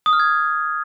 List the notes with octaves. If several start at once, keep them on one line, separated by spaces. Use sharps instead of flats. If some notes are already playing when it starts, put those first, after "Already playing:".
D#6
F6
G#6